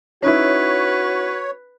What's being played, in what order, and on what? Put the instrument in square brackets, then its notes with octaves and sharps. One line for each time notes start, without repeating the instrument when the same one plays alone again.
[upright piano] C#4 D#4 E4 [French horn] F#4 [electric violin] B4 [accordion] C#5